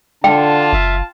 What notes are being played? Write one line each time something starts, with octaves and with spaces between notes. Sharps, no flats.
D3 D4 F4 G5 A5
F#1 E5 F5